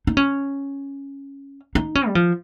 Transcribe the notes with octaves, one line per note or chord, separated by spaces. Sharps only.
D#4
C#4
D#4
C#4
G3
F3